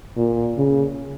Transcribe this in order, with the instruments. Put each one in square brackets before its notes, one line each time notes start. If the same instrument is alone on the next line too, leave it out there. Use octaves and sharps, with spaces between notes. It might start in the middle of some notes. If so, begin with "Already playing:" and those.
[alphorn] A#2
C#3